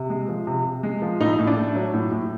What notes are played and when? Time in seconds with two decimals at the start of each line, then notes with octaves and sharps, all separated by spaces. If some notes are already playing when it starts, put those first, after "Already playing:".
Already playing: C3
0.10 G#3
0.28 F3
0.47 C3
0.65 C3
0.83 G#3
1.02 F3
1.20 A2 D#4
1.39 A2
1.47 D4
1.57 A3
1.75 F#3
1.94 A2
2.12 A2